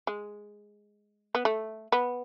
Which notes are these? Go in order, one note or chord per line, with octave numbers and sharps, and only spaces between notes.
G#3
B3
A3
B3